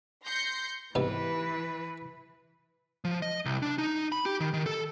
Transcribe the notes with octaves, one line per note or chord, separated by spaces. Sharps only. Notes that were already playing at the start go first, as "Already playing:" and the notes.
C6 G6 A#6 C7 C#7
G#2 C3 E3 B3 B4
F3
D#5
C2
D4
D#4
B5
G4
D#3
D#3
A4